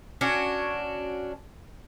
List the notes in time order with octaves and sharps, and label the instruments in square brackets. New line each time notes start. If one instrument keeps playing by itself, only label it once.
[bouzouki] C#4 D4 F#4